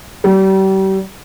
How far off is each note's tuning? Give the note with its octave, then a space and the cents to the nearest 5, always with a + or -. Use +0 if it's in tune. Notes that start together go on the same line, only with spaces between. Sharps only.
G3 -35